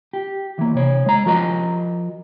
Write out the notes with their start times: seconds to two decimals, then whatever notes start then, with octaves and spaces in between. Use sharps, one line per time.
0.13 G4
0.59 E3 A#3
0.75 C3 C#5
1.06 G#3 A#5
1.26 F3 F#4 A#4 D#5 A#5